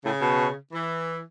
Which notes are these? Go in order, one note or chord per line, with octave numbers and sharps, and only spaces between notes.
A2 C#3
B2
E3